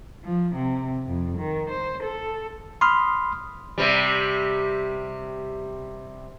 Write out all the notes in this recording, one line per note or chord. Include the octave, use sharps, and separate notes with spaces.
F3
C3
F2
D#3
C5
A4
B5 C6 D#6 F6
C3 G3